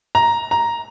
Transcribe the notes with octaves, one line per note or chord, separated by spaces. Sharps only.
A#5
A#5